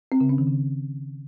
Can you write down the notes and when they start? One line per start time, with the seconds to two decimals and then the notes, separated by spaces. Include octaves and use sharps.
0.12 C4
0.21 C#3
0.29 C#4
0.38 D#3
0.47 C#3